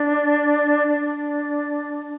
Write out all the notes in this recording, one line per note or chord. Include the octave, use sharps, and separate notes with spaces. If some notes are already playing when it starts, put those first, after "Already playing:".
Already playing: D4
D4